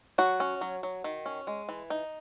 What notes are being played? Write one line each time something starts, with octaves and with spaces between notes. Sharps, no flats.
F#3 F#4
C#4
F#3
F#3
D#3
C#4
G#3
E3
D#4